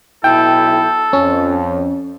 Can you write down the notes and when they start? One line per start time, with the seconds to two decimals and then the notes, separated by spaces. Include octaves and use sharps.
0.24 B1 E4 A4 G5
1.13 F2 C#4